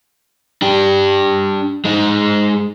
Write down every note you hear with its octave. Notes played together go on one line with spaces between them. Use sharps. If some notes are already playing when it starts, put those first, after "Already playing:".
D4 G4
G#3 D#4